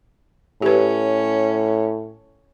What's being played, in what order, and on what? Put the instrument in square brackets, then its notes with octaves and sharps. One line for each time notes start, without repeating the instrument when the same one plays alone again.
[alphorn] A2 [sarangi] C#4 [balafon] G4 B4